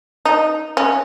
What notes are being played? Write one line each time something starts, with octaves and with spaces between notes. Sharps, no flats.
D#4
C#4